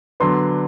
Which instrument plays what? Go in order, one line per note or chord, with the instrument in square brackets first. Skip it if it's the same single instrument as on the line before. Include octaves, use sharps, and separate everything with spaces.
[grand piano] D3 F#3 B3 D4 C6